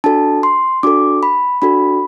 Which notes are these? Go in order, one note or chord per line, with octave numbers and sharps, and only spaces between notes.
D4 F#4 A4 A5
C6
D4 F#4 A4 D6
B5
D4 F#4 A4 B5